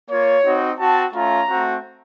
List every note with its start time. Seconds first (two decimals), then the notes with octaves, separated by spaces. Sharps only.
0.10 A#3 F4 C#5
0.44 C4 D#4 F#4
0.79 C4 F#4 A5
1.15 A3 C#4 F4 A#5
1.49 A3 C4 F#4